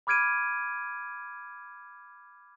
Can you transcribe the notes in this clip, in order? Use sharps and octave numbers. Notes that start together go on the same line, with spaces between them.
B5 D6 F6 G#6 D7 D#7